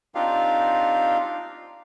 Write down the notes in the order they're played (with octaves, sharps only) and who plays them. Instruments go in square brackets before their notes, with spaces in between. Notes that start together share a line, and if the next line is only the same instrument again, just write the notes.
[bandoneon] C4 D4 D#4 F4 G4 F5